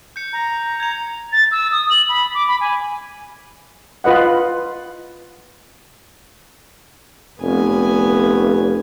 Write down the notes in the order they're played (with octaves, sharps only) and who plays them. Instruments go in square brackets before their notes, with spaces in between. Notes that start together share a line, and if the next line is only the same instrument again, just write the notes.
[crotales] G6 C#7
[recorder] A#5
[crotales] G#6 F7
[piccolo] A6
E6
D#6
F#7
B5
D6
B5
G#5
[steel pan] F4 B4 D#5 F#5
[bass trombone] F1 [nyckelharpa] B3 G#5